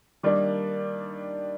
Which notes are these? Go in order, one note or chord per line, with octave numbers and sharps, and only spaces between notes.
D#3 G3 A#3 D4